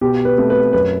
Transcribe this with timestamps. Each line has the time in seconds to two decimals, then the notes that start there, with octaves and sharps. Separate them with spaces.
0.01 B2 G4
0.25 B4
0.38 A3 C4
0.50 B4
0.73 F#2 B4